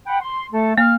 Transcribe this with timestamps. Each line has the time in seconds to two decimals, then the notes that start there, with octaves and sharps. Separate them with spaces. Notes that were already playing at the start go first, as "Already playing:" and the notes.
0.07 F#5 G5 B5
0.21 C6
0.53 A3 A4
0.78 A#3 F5 F6